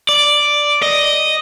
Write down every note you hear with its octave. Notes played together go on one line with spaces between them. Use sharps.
D5
D#5